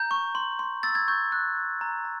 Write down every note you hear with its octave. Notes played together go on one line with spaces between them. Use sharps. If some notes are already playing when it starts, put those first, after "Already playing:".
Already playing: A#5 G6
C#6
C6
C6
E6 A6
G#6
C#6 G6
F#6
F#6
A#5
A#5